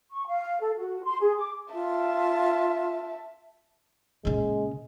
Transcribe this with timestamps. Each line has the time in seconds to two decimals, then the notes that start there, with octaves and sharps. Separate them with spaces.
0.10 C#6
0.27 F5
0.60 A4
0.78 F#4
1.04 C6
1.21 G#4
1.38 D6
1.74 F4 E5 A5
4.25 A#2 C#3 G#3